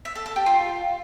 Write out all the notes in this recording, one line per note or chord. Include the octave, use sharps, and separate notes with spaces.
E5
A4
A4
G4
F4